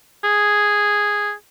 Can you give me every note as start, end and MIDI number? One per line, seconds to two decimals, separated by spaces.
0.24 1.32 68